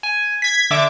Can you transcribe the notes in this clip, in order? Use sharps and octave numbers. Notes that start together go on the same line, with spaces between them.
G#5
G#6 B6
D3 E5 D6